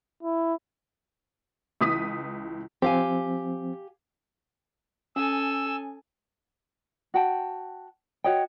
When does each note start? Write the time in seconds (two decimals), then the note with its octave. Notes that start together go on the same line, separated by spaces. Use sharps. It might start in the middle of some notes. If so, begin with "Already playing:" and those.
0.23 E4
1.81 C#2 E3 D#6 B6
2.82 F3 C4 G4 F5 G#5
5.16 C#4 A4 G#5 E6
7.14 F#4 F#5 G5 A5
8.24 F#4 C#5 D#5 G5